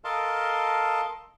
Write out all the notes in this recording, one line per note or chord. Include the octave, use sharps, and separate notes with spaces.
A4 A#4 D#5 F5 A5 C6